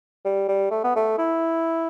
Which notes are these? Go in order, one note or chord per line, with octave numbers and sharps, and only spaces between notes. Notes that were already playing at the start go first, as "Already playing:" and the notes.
G3
G3
A3
B3
A3
E4